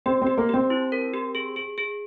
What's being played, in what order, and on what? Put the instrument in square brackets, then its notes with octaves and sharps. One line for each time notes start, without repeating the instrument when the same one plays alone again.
[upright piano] C4 [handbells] G4
[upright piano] C4 [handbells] G4
[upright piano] A#3
[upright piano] C4 [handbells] G4
[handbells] E4
A#4
G4
G#4
G#4
G#4